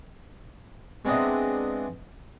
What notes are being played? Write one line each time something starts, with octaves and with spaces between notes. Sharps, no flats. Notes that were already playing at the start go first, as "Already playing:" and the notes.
G#3 B3 C4 D4 D#5 E5